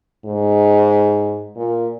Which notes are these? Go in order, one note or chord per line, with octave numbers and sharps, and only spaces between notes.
G#2
A#2